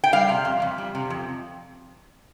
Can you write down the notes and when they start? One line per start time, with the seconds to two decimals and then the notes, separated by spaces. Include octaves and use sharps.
0.04 G5
0.13 G3 F5
0.29 C3
0.45 F2
0.62 F2
0.78 G3
0.95 C3
1.10 F2